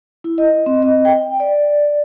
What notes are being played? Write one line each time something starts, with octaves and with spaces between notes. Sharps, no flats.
E4
D#5
C4
D#5
G5
D5